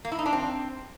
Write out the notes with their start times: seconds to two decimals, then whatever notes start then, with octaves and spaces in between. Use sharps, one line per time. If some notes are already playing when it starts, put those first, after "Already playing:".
0.05 A#3
0.12 E4
0.19 D#4
0.26 D4
0.33 C4